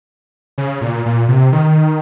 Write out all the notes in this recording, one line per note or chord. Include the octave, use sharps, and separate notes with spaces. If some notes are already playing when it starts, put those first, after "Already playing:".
C#3
A#2
A#2
C3
D#3